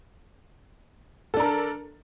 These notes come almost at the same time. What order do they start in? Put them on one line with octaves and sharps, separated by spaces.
A4 D4 A#4